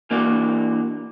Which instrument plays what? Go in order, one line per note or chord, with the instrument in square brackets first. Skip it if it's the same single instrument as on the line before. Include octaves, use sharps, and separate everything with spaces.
[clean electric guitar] E3 A#3 D4 F#4 D5